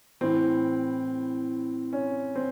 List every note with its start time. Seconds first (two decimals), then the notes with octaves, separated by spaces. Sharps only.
0.21 A2 E3 C4
1.93 C#4
2.36 C4